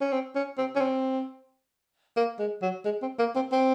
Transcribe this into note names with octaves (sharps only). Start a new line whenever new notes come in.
C#4
C4
C#4
C4
C#4
C4
A#3
G#3
F#3
G#3
C4
A#3
C4
C4